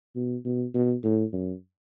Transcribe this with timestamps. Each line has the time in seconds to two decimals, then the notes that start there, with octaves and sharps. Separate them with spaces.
0.16 B2
0.45 B2
0.74 B2
1.04 A2
1.33 F#2